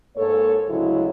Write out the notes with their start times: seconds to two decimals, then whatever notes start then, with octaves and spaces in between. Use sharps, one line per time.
0.16 G#2 A#3 A4 C#5
0.69 D2 C#3 F#3 G#3 E4